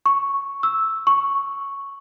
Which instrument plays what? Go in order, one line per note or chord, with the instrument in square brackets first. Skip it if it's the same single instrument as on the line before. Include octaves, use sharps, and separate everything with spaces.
[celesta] C#6
E6
C#6